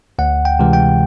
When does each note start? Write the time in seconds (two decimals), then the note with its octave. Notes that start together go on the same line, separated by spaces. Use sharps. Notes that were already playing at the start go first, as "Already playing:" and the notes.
0.19 D2 F#5
0.45 G5
0.59 C3 E3 G#3
0.73 G5